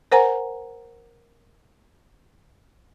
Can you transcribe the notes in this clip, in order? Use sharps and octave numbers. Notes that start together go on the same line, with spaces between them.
A#4 C5 F#5 G#5 A#5